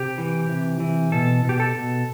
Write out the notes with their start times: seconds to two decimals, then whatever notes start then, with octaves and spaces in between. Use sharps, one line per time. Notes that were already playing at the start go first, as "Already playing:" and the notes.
Already playing: C3 G4
0.18 E3
0.49 C3
0.80 E3
1.12 B2 A4
1.45 B2 G4
1.60 A4
1.76 B2